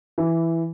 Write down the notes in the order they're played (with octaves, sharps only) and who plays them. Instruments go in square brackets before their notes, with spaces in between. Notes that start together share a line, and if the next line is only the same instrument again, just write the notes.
[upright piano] E3